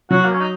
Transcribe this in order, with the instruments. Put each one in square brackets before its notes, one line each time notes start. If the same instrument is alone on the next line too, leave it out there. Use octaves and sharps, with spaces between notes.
[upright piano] F#3 [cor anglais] F#4
[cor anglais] A#3
C#4
D#4